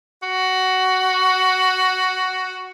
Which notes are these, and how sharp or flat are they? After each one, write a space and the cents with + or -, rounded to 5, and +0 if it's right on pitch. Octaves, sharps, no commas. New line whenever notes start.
F#4 +10